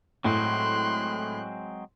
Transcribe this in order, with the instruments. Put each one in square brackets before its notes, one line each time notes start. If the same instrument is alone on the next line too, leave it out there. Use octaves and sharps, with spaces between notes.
[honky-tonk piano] A2 [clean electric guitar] F#3 G#3 C4 [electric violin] C6 F#6